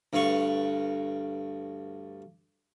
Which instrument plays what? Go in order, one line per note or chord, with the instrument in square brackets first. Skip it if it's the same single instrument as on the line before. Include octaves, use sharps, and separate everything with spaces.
[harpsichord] D2 G2 B4 F5 C#6